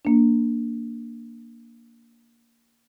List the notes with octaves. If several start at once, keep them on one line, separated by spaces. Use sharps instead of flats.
A#3 D4